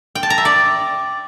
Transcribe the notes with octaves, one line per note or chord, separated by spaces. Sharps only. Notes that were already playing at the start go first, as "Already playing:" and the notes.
G5
A5
A#5
E5
D5